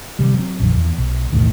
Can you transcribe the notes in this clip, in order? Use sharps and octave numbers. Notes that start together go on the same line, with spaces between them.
C3 D#3 G3
F#3 C4
A#1 F2 D#3
E2
B1
B1 E2 A2 D#3